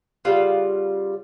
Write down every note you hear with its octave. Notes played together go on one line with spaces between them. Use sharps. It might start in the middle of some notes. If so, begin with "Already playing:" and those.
C#3 G3 F4 F#5